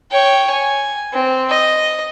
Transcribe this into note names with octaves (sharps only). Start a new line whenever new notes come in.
C#5 G5
G#5
C4
D#5